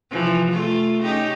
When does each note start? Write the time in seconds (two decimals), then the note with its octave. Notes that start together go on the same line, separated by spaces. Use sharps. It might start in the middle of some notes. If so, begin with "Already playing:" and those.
0.11 C3 E3 F3
0.51 A3 F4
1.02 C#4 D#4 G4